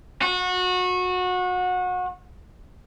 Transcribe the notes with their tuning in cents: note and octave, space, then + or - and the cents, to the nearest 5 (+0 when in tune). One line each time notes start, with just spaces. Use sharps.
F#4 -25